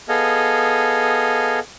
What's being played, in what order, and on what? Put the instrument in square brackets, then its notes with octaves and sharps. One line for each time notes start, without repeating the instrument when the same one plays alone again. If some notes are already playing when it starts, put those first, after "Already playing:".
[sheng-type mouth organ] B3 G#4 A4 D#5 F5